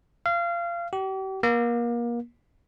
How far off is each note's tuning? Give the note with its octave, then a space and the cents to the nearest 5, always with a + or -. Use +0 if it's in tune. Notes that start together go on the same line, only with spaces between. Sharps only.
F5 -25
G4 -40
A#3 +30